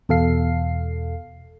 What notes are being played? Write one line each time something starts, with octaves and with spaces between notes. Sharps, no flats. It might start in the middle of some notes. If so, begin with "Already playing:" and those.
E2 B2 A4 F5 C7